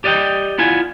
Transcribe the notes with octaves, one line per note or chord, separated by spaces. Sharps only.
G4 D5 D#5 F5 G5
B3 E4 F4 G#5